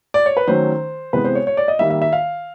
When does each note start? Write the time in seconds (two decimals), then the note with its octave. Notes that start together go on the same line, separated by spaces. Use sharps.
0.14 D5
0.26 C#5
0.37 B4
0.47 D#3 F#3 A3 C#4 C5
1.13 C3 E3 G#3 B3 B4
1.24 C5
1.35 C#5
1.47 C#5
1.57 D5
1.68 D#5
1.79 D#3 G3 A#3 E5
1.90 E5
2.02 E5
2.13 F5